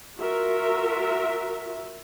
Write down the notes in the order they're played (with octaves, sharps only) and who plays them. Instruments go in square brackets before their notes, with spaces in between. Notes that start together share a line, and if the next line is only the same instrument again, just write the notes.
[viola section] F4 F#4 A#4 E5